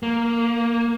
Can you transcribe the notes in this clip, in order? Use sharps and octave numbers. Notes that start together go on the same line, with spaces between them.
A#3